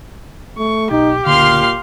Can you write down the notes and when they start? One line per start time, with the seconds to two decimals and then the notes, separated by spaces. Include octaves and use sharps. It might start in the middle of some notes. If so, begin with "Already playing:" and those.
0.58 A3 C#6
0.91 B1 D#4 G4
1.26 C#2 A#2 D3 F5 C6 F6